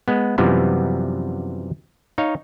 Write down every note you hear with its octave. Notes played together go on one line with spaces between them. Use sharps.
G#3 B3
F#2 C3 E3 F3 G3 B3
D#4 C#5 F5